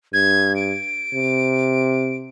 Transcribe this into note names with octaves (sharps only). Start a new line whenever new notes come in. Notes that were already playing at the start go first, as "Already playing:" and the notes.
G2 G#6
D7
C3